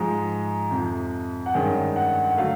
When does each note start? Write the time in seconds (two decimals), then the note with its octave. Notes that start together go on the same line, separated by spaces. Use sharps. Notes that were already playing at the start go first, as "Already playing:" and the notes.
Already playing: G#2 F3 G#3
0.71 F2 C3 F3
1.46 F#5
1.54 G2 D#3 G#3 C#4 G5
1.96 F#5
2.30 F#5
2.37 D3 F#3 A3 F5